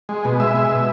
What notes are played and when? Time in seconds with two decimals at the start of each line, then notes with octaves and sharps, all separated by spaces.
0.09 G#3
0.25 B2
0.40 G#3 E5
0.55 G#3
0.71 B2